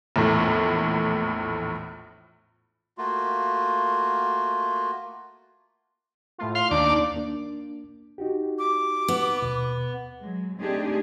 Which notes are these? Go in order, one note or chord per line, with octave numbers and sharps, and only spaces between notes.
A#1 E2 A2
A3 A#3 F4 F#4
A2 A3 F4
F5 C6
D#2 A#3 D4 D5 D6
A#3 D4
D#4 F#4 G4
D6
B3
D#2 B2
F#3 G#3
A3 C4 D4 D#4 G4 G#4